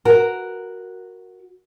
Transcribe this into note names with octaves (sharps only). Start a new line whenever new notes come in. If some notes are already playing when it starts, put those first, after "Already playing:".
F#4 A#4